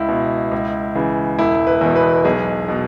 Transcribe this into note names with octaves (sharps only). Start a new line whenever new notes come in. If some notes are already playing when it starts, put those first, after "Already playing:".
Already playing: C#2 E4
B2
C#2
C#3 E3
E1 E4
B4
E2 B2
B4
B1 G#4
B2